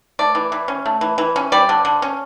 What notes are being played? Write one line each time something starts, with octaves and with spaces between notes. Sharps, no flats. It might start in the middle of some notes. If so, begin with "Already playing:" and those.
A3 D5
E3
E3
C#4
A3
E3
E3
C#4
G3 D5
D3
D3
C#4